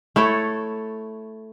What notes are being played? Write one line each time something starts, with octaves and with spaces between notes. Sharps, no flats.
A3 E4 A4 C#5